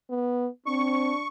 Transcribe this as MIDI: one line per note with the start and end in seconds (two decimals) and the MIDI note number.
0.10 0.48 59
0.66 1.11 60
0.66 1.27 62
0.66 1.28 85